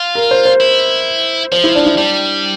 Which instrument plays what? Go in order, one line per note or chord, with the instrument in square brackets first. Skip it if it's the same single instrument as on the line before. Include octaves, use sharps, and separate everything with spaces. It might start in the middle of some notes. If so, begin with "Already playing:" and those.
Already playing: [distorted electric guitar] F4
[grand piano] A#4
C5
C5
[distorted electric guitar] E4
[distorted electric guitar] F3 [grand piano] C5
[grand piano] E4
D4
E4
[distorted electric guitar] G3 [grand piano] D4